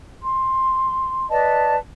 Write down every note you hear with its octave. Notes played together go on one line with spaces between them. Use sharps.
C6
B4 D5 D#5 A5